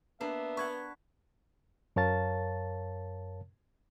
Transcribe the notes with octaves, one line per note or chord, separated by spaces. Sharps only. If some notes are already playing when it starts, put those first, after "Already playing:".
A#3 B3 D4 E5
B4 F#5 C#6 G#6
F#2 A#4 C#5 F5 A5 A6